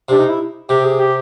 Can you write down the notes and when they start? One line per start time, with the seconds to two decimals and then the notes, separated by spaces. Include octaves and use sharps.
0.09 C3 D4
0.19 D#4
0.29 E4
0.69 C3 G4
0.84 G#4
1.00 G4